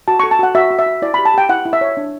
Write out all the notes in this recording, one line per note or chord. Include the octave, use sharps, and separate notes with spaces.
F#4 A5
A4 C#6
A5
F#4 F#5
F#4 E5
F#4
E5
F#4
E4 D5
G4 B5
A5
G4 G5
E4 F#5
E4
E5
C#5
D4